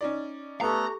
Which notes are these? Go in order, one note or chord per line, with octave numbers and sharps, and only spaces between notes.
C#4 D#4 D5
A3 B3 G4 A4 A#5 C#6